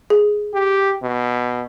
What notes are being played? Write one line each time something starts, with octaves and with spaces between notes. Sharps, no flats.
G#4
G4
B2